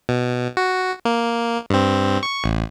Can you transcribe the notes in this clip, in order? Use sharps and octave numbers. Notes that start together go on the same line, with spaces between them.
B2
F#4
A#3
G2 C4
C#6
A1